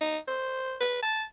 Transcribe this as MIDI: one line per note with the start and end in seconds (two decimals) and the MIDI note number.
0.01 0.17 63
0.28 0.76 72
0.81 1.02 71
1.03 1.24 81